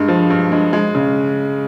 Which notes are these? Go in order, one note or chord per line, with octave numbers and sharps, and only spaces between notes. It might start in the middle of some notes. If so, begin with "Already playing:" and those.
Already playing: G2 G#3
F3
G2
G#3
G#3
C#3